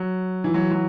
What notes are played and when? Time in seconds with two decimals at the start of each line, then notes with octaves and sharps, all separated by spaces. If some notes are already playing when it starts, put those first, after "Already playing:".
Already playing: F#3
0.44 E3
0.54 F#3
0.71 F#3